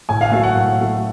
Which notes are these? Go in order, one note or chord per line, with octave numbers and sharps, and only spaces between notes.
A2 G#5
F5
F#3 A3 F5
F#5
A2
F#3 A3